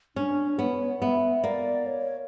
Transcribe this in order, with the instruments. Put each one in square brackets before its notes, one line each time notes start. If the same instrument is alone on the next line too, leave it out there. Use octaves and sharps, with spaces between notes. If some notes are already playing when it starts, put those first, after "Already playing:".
[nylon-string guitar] C#4 [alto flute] D4
[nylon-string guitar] B3 [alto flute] C#5
[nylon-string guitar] B3 [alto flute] E5
[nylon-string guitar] A#3 [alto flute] D5
[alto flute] C#5